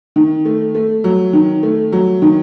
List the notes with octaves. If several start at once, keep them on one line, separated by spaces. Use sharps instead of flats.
D#3
A3
A3
F#3
D#3
A3
F#3
D#3